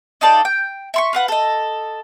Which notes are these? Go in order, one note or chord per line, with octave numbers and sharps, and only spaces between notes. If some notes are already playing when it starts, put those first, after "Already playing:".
D#4 F4 A4 D5
G5
E5 C6 C#6
F4 B4 F#5
A4 D#5